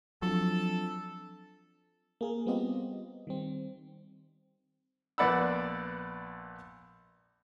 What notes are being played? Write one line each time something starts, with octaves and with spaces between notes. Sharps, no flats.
F3 F#3 C4 D4 F4 A4
A#3 G#4 A#4
G3 B3 C4 F4 G4 D#5
D#3 G3 C4
A#1 B3 D5 F#5 B5 E6